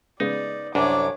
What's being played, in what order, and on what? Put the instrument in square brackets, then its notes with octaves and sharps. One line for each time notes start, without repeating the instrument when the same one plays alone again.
[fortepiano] C#3 G#3 B3 [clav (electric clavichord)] D#4 [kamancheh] D5
[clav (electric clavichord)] C2 F#2 [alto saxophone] D4 [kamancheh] C#5 D6